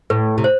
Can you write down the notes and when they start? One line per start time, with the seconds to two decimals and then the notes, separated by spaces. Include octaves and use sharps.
0.10 A2 B4
0.38 C3
0.44 C5